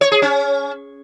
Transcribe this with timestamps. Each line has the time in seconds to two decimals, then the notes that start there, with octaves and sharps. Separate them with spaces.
0.01 C#5
0.12 G#4
0.22 C#4